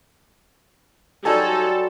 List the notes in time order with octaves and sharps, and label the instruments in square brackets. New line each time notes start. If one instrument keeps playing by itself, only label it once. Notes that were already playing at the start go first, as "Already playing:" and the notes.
[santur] F#3 G3 C5 [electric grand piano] D#4 G#5 A5 [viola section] A4